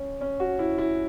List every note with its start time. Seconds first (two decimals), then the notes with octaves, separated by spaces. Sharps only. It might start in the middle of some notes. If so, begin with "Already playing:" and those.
Already playing: C#4
0.21 C#4
0.40 F#4
0.59 E4
0.78 E4